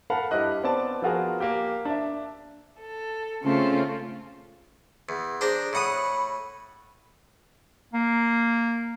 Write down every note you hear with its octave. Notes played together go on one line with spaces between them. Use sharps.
A4 A#4 F5 F#5 A5 B5
G2 E4 G4 D#5 F#6
B3 C4 D5 A5
F3 B3 F4 F#4 G#4 A#4
A#3 G4
D4 E5
A4
C#3 A3 C4 C#4 F4 A4
E2
D4 G#4 C5 A#5
A2 F#5 B5 D#6
A#3